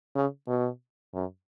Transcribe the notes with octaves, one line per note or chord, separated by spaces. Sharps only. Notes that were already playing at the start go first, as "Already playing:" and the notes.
C#3
B2
F#2